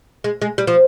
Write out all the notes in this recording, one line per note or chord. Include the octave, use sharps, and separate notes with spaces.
G#3
G#3
G3
F3